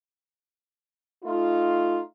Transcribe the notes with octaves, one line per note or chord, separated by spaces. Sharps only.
A3 D#4 F4